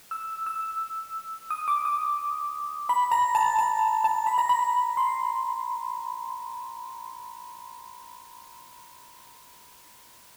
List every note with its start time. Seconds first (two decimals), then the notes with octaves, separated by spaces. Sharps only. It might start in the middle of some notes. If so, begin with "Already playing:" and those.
0.11 E6
0.46 E6
1.50 D#6
1.68 D6
1.85 D#6
2.89 B5
3.12 A#5
3.35 A5
3.59 A5
4.04 A5
4.27 B5
4.38 A#5
4.49 B5
4.97 C6